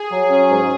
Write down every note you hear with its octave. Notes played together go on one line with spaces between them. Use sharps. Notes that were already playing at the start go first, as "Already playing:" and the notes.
Already playing: G#4
F#3
C#4
G#2